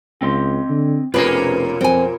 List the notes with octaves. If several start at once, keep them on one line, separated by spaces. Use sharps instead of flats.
C#2 C4 D#5 C6
D3
F1 B2 A#3 C#4 F4 G#4 A#4 B4
F2 C4 G#5